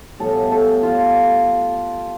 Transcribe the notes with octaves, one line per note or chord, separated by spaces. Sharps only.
A2 G3 B3 F4 A4
A4
F4